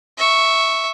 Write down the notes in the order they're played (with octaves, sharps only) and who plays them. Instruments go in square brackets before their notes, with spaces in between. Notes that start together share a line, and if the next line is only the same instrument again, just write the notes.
[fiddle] E5 C#6